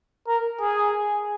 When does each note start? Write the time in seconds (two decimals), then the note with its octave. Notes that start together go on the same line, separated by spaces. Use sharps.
0.28 A#4
0.61 G#4